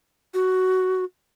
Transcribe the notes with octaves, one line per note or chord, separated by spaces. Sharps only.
F#4